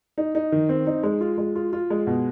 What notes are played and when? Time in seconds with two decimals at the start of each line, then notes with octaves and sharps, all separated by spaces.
0.18 D#4
0.35 D#4
0.52 D#3
0.69 C4
0.87 D#4
1.03 G#3
1.21 F4
1.38 G#3
1.55 F4
1.73 F4
1.90 G#3
2.07 B2